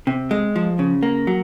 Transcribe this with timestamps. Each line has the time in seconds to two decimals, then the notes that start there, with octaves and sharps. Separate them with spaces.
0.07 C3
0.31 G#3
0.56 F3
0.79 C#3
1.03 A#3
1.27 F#3